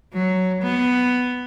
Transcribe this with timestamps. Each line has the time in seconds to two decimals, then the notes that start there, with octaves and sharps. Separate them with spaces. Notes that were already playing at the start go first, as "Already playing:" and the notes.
0.14 F#3
0.62 B3